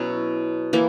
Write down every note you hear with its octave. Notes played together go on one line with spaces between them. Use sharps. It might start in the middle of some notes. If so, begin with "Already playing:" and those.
Already playing: B2 F#3 C#4 E4
E3 A#3 E4